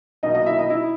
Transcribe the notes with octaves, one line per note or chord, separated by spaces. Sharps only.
B1 B2 A#3 D#4 D#5
D#4 D#5
E4 E5
D#4 D#5
E4